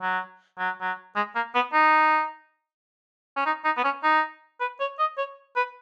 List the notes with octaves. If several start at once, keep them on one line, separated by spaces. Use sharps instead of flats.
F#3
F#3
F#3
G#3
A#3
B3
D#4
C#4
D#4
D#4
B3
C#4
D#4
B4
C#5
D#5
C#5
B4